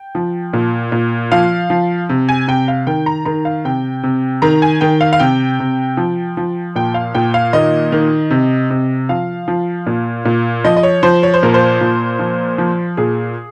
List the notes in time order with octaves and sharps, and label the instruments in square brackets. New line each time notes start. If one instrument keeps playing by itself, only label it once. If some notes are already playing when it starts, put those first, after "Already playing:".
Already playing: [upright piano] G5
F3
A#2
A#2
F3 F5
F3
C3
G#5
C3 G5
F5
D#3 G5
A#5
D#3 A#5
F5
C3 G5
C3
D#3 A#5
G#5
D#3 G5
F5
F5
C3 G5
C3
F3
F3
A#2 G5
F5
A#2 G5
F5
D#3 D#5
D#3
C3
C3
F3 F5
F3
A#2
A#2
F3 D#5
D#5
C#5
F3 C5
C#5
C5
A#2 A#4
C5
A#2
F3
F3
A#2 G#4